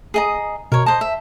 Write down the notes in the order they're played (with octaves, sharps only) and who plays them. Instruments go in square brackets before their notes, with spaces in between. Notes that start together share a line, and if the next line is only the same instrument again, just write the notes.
[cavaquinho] G#4 D#5 A#5
[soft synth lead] B2 [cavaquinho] A#4 C#5
[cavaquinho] C5 D#5 [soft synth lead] A5
[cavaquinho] E5